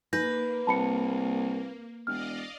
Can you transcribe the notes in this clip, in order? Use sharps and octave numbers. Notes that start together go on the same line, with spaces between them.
A#3 D#4 B4 G6 A#6
C2 A5 B5 C#7
E1 D5 D#5 F5 F6